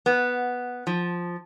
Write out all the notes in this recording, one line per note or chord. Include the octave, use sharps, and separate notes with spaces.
B3
F3